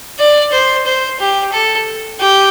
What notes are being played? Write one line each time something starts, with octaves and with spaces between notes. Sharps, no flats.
D5
C5
C5
G4
A4
G4